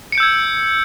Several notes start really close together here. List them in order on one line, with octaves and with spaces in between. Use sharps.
C#7 D7 G6 E6 G#6